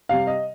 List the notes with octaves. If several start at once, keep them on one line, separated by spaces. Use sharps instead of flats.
C3 G3 F5
D#5